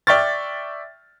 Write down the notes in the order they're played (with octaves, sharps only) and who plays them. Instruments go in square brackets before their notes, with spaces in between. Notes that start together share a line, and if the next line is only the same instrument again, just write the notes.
[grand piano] D5 E5 G5 C#6 F6 A6